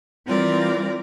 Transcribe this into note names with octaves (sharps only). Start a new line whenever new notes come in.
E3 G3 C4 F4 A#4 D5